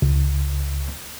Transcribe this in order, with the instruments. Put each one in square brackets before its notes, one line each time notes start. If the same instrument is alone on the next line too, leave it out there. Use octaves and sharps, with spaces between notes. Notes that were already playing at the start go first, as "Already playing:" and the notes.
[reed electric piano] C#2